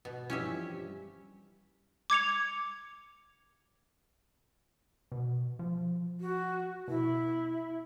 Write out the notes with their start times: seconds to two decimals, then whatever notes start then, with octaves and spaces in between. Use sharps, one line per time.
0.05 B2
0.30 G2 E3 F3 C#4 G4 E5
0.72 G3
2.10 D6 G#6 C#7 F7
5.12 B2
5.59 F3
6.20 F#4
6.88 B2 E4